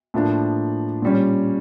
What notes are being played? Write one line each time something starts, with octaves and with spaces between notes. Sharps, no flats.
A2 F3 A#3 D4
A#2 G3 C#4